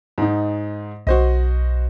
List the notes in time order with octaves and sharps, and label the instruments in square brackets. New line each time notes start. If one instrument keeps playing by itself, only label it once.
[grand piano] G#2 D#4
[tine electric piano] B1 [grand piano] F#4 C5 D#5